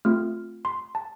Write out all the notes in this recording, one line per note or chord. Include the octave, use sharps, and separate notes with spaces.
A3 C4 F4 F6
C6
A5